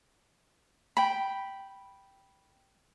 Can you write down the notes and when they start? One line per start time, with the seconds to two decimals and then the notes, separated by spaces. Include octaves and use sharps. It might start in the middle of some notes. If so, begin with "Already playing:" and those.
0.97 G5 B5